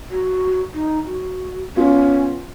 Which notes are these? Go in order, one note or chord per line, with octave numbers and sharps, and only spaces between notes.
F#4
D#4
F#4
B3 C#4 F4